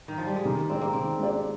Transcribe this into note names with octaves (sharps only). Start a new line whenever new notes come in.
D#3
F3
G3
G#3
D#3 A#3
G#3 C4 D4 G4 D5
A#3
D#3 C4
G#3 D4 G4 D5